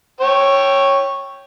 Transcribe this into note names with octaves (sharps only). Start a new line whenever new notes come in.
C#5 G5